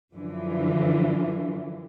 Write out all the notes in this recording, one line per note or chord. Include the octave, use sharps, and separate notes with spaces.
F#2 D3 E3 F3